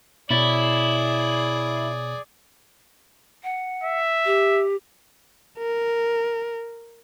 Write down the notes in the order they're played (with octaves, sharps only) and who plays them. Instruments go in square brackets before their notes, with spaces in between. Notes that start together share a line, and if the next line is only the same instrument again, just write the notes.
[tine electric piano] B2 C#5 A6 [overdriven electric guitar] E4 [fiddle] G#4 D5
[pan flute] F#5
[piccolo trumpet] E5
[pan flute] G4
[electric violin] A#4